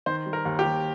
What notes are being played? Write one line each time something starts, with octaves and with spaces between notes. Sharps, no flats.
D#3 C5
G3
A#4
D#2
G4
D#2